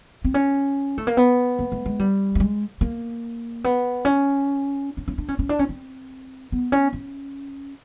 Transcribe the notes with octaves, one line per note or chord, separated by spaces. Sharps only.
C4
C#4
A3
A#3
B3
A#3
A3
G#3
G3
A3
G#3
A#3
B3
C#4
C#4
C#4
D4
C#4
C#4
D4
C#4
C4
B3
C#4
C#4